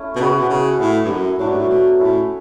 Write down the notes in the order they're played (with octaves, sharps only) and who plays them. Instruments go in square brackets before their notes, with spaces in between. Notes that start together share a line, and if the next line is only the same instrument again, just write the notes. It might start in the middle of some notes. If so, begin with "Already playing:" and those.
Already playing: [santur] A3 C#4 E4
[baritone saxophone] B2
[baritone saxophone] C#3 [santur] B3 F#4 B4
[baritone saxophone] B2
C#3
[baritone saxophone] A2 [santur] B3 E4 A4 E5
[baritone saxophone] G2
F#2
[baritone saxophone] A2 [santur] F#3 A3 D4
[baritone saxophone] G2
A2
B2
[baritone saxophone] A2 [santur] C#4 E4 A4 E5